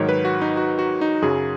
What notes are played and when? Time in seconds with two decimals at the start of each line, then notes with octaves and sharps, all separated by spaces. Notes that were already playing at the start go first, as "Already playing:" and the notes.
Already playing: G#2 D#3 F#3 C#5
0.09 B4
0.25 F#4
0.41 D#4
0.57 F#4
0.79 F#4
1.01 D#4
1.22 F#2 C#3 F#3 G#4